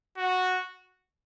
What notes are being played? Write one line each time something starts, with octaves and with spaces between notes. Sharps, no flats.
F#4